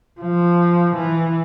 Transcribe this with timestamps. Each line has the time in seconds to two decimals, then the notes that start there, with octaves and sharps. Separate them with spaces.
0.21 F3
0.96 E3